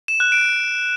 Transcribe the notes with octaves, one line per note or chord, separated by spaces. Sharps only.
E7
F#6
D7